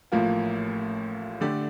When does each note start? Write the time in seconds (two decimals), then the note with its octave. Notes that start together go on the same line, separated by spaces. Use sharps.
0.12 A1 A2 F3 A#3 F4
1.41 D3 A3 D4 G4 D5